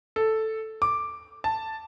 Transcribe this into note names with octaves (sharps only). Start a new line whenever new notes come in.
A4
D6
A5